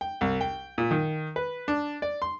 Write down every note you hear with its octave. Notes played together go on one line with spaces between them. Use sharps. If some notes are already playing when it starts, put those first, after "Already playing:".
G5
C2
G5
A#2
D#3
B4
D4
D5
C6